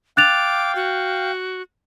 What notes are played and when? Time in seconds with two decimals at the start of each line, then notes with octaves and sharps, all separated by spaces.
0.17 F5 G5 D6 F#6 A6 F7
0.75 F#4